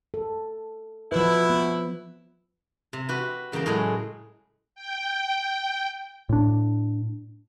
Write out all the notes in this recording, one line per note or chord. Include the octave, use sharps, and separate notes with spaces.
A4
B2 F3 E4 B4
B3
C3
F#4 G4 B4
E2 C#3 A#3 G5 A#5
A2 C#3 F#3 G#3 G#4
G5
A2 D4